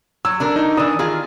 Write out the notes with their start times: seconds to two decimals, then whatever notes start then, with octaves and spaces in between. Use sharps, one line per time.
0.25 F#3 E6
0.40 D3 D4 A#4
0.56 D#4
0.77 E3 D4 D#6
0.99 D#3 F4 G#4